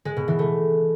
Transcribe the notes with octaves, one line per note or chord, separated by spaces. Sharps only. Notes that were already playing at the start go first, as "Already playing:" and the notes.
G#3
B2
E3
A3